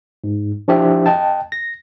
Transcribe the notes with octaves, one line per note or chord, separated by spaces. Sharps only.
G#2
F3 D4 E4 G4 C5 E5
D#5 G5 A5
A#6